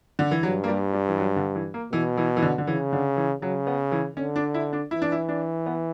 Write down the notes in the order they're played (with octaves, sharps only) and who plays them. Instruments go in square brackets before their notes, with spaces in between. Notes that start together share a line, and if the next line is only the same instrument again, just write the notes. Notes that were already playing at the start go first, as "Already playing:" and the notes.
[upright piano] D3
E3
[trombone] G2 [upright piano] F#3
[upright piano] A#3
G3
G3
E3
F#3
D3
E3
A#3
[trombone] B2 [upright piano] E3
[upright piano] E3
E3
D3
D3
[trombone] C#3 [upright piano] E3
[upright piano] D3
E3
[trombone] C#3 [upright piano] F#3
[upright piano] B3
E3
[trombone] D3 [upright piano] C#4
[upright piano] D4
E4
D4
[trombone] E3 [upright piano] E4
[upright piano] D4
E4
D4
B3